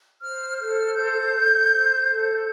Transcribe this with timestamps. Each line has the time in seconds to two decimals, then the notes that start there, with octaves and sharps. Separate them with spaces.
0.21 C5 F6
0.58 A4 F6
0.95 C5 G6
1.33 A4
1.71 C5
2.09 A4